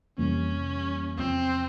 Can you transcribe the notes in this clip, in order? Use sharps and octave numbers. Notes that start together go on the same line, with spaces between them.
F2 C3 E3 G3 A#3 C#4
E2 C3 F3 C4